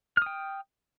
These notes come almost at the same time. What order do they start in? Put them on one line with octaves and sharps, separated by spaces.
F6 D#6 G5